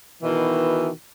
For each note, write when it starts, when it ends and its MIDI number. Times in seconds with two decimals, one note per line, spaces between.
0.22 0.89 47
0.22 0.89 51
0.22 0.89 52